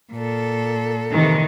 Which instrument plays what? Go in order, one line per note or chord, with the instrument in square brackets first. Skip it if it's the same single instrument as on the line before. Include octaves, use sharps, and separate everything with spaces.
[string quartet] A#2 A4
[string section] C3 D#3 E3